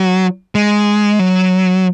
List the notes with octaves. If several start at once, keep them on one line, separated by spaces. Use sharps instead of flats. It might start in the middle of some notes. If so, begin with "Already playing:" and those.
Already playing: F#3
G#3
F#3